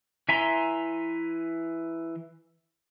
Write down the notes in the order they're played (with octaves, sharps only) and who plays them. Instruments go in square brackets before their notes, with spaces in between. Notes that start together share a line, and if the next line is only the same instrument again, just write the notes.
[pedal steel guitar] E3 E5 G#5 A#5 C6